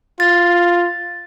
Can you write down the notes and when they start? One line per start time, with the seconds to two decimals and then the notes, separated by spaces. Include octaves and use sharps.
0.20 F4 A6